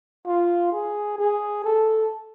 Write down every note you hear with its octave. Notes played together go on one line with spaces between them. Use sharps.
F4
G#4
G#4
A4